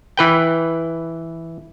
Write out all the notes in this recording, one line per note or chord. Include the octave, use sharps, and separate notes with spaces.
E3 B4 G5